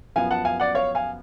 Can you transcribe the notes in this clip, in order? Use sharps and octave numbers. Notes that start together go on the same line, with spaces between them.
F#2 F3 B3 F5 G#5
F#5 A5
F5 G#5
D5 F#5
C#5 F5
F5 G#5